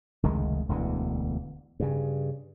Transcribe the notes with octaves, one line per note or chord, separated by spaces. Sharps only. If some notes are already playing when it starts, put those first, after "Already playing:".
F1 C#2 D#3 G#3
E1 D2 D3 E3
G2 C#3